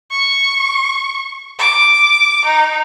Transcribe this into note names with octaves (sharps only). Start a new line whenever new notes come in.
C#6
D6
D#4